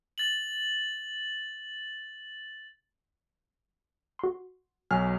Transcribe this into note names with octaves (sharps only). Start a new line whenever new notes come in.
A6 F#7
F#4 C6
B1 F#3 G#5 F6